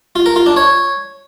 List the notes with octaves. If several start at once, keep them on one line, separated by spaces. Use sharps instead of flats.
F4
A#4
F4
D4
C#5